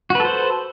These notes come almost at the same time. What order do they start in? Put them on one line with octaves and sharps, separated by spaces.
F#4 B4 A4 C5